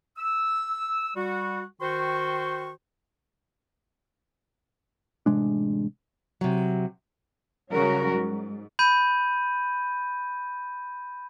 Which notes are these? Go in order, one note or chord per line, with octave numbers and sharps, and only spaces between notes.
E6
G3 F#4
D#3 F#4 C5 G5 C6 C#6
A1 C3 G#3 D4
C3 F#3
C#3 F#3 G3 C#4 F#4 A#4
G#2
B5 G6 D#7